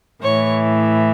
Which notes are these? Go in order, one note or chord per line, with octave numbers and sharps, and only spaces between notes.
A2 E3 C#5